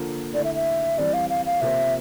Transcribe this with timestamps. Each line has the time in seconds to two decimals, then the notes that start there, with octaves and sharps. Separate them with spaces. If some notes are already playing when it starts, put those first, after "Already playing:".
Already playing: D3 F3 A#3 F4 A#4
0.34 D3 A3 E4 D5
0.44 E5
0.55 E5
0.97 E3 G3 C4 D5
1.13 F5
1.30 F5
1.46 F5
1.61 C3 F3 A#3 F4 C5 E5